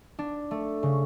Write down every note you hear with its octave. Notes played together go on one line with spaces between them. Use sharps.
D4
A3
C#3